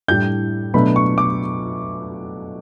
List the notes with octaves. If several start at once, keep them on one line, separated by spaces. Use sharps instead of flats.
A2 G3 D4 G6
B2 F#3 A3 D4 B5
C#6
D6